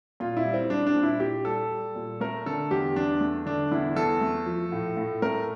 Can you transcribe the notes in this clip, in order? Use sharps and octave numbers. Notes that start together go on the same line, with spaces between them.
A#2 F4
E4
G3
C4
G3 D4
D4
A#2
E4
A#2 G4
G3 A4
G3
A#2
A3 A#4
D3 A4
E2 G4
E2 D4
A3
D3 D4
E2 E4
E2 A4
A3
F3
A2
A2
A3 A#4